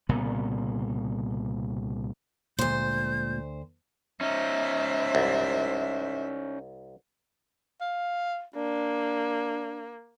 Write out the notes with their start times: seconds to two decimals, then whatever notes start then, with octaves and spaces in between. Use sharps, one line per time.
0.09 C2 A#2 C#3 B3
2.59 D2 A#2 G#3 C5 G6
4.21 C#4 D#4 C5 E5
5.15 C2
7.81 F5
8.55 A#3 D4